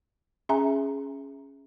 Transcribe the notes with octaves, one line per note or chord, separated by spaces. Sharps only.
C#4 G#4 E5 G#5 A#5